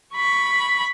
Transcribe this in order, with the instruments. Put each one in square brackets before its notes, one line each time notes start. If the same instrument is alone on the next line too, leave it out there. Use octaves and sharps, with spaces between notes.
[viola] B5 C#6